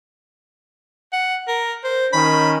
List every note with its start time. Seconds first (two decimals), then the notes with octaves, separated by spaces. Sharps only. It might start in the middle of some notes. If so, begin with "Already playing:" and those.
1.13 F#5
1.48 A#4
1.84 C5
2.13 D#3 C#4 B5